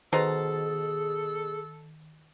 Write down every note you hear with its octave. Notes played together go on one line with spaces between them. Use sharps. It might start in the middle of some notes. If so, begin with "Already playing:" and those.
B2 D#3 G#4 A4 C5 A#5 A6